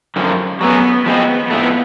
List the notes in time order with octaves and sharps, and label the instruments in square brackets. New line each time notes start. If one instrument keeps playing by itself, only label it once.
[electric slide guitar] F#2 D3 F3
[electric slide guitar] F#3 A3 C#4 [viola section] B3
[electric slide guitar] F3 G#3 C4 [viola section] B3
[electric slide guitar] A2 F3 A3